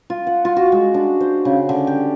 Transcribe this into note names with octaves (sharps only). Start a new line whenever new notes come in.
F4
F#5
F4
F#4
G#3
D4
C5
C#3
D3
G4